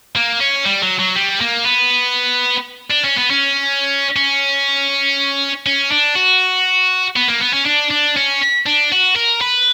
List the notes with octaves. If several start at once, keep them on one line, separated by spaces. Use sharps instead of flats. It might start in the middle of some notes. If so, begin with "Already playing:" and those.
A#3
C#4
G3
F#3
F#3
G3
A#3
B3
D4
C#4
B3
C#4
C#4
C#4
D4
F#4
B3
A#3
B3
C#4
D4
D4
C#4
D4
F#4
A#4
B4